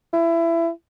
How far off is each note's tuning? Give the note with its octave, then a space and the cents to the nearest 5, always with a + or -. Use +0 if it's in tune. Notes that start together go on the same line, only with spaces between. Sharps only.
E4 +20